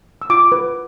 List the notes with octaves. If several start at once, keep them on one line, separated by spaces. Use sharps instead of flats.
E6
F4 D6
B4